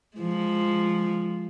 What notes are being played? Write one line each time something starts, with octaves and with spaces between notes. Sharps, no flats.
F3 G#3